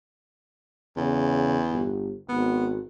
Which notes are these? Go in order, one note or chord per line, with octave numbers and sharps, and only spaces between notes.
E2 C#3
G1
G#1 B3